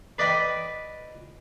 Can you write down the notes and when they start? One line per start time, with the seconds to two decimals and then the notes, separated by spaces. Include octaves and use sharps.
0.18 B4 D5 D#5 G5 B5